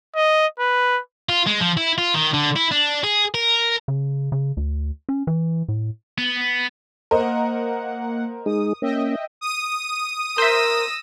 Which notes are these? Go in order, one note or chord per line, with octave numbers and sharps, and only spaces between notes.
D#5
B4
F4
G#3
F3
E4
F4
D#3
D3
E4
D4
G#4
A#4
C#3
C#3
D2
C#4
E3
A2
B3
A#3 A#4 C5 D#5 F#5
G#3 D#4 G#4 D#6
A#3 C#4 D#5 E5 G5
D#6 D#7
A#4 C5 E5 E6 A#6